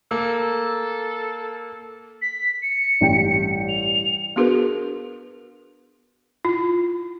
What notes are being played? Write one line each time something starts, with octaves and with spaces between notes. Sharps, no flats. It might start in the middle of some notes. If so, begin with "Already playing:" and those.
A#3 A4
B6
C#7
A1 G2 G5
F7
B3 D4 F#4 G#4 A#4 B4
E4 F4